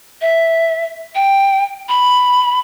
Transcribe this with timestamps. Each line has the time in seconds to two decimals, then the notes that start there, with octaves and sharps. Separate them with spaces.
0.21 E5
1.15 G5
1.89 B5